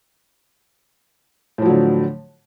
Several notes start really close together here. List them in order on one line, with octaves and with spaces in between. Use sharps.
A2 F3 F#3 D3